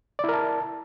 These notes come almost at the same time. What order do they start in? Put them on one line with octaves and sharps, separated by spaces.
D5 E4 A#4 A5